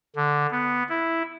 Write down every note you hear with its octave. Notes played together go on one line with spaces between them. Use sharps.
D3
B3
E4